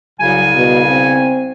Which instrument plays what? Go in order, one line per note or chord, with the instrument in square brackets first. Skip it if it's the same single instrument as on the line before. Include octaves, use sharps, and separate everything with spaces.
[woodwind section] C2 C#3 G#5 [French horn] F#3
[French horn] B2
C4